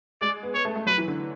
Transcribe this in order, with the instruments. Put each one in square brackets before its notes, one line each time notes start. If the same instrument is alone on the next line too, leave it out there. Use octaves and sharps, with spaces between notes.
[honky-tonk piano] G#3 [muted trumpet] D5
[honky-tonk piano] B3
[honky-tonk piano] B3 [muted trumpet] C#5
[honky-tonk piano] A3
A3
[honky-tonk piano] F#3 [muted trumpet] B4
[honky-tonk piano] E3
D3